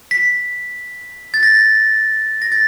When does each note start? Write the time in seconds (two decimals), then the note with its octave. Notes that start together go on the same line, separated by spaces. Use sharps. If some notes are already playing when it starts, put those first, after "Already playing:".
0.11 B6
1.34 A6
1.43 A#6
2.42 A#6
2.52 A6